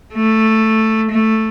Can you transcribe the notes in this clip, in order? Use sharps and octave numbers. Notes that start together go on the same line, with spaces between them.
A3
A3